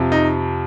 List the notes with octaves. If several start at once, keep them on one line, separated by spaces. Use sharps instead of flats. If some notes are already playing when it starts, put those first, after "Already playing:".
Already playing: F2 C3 F3
D#4